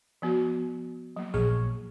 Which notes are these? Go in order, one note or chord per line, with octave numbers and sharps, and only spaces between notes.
F3 B3 F#4
F#3 A#3
A#1 G#4 C#5